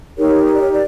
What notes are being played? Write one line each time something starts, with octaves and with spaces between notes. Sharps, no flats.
D#4 G4 A#4 C#5
C#5
D5
C#5
D5